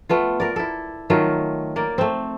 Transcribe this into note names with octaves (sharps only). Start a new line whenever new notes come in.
A3 B3 F4
A#4 D5
E4 A4
D#3 F#3 A3 F4
A#3 D5
A3 C4